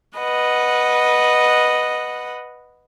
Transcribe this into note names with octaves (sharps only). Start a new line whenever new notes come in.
B4 D#5 F#5